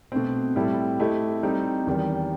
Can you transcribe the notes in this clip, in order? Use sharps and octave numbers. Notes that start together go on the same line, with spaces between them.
B2 A3 C4
A2 G3 C4 E4 A4
A3 C4 E4 G4 D#5
G3 C4 D#4
E2 D#3 G3